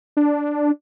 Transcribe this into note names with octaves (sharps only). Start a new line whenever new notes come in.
D4